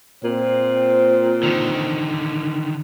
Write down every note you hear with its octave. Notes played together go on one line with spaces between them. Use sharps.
A#2 C4 C5
D3 D#3